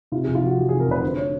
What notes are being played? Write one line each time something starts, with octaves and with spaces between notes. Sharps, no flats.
C3 F4
G#4
F1
F4
F2 F#4
E3 G4
G#4
C3
A#4
F1 B4
D3 C5
C#5